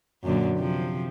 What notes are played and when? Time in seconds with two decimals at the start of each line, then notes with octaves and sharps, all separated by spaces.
0.24 F#2 A#2 D3
0.57 C3 F3